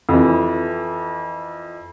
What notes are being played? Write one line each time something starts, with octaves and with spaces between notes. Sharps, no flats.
F2 E3